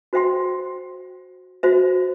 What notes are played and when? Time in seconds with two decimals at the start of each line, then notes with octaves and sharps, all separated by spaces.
0.13 F#4 C5 E5 G5 C6
1.63 F#4 C5 E5